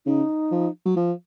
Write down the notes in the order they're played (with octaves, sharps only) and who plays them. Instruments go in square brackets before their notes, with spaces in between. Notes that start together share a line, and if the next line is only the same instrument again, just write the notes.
[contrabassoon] C#3 [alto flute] D#4
[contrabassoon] F3
F#3
F3